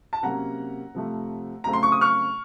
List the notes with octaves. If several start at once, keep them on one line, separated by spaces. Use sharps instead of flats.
A5
C3 F#3 A#3 C#4 F#5 A#5
C3 F3 A3
C#3 F#3 A3 C4 A#5
C6
C#6
D#6
C#6 F6